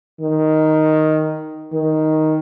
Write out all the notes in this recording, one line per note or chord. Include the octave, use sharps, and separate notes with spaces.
D#3
D#3